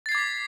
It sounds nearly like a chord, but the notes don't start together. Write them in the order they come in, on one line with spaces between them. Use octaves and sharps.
A6 C7 G#6 D6 B6